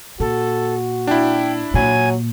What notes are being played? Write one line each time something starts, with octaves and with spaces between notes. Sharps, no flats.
A#2 F#4 A4
D4 E4 G5
A#2 F#3 G#5